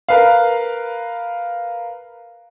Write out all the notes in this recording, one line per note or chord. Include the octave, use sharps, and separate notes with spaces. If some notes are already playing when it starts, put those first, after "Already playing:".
A#4 B4 F5